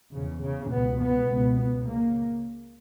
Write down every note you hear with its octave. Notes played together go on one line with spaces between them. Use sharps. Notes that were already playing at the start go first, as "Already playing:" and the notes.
E2 C#3
C#3
C#2 B2 B3
B3
C#2 B2
B3
C#3 A#3